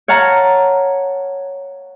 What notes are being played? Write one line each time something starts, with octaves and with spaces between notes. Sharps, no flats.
C#5 F5 F#5 A5 A#5